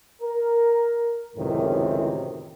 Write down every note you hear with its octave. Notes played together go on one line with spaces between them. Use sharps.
A#4
C#2 F#2 A2 C3 D#3 E3